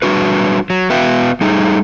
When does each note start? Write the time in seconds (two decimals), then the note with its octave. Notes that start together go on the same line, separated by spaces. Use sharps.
0.02 F#3 G3 D4 F#4 B4
0.70 F#3
0.90 B3 F#4 B4 E5 F5 G5
1.41 G3 A3 D#4 G#4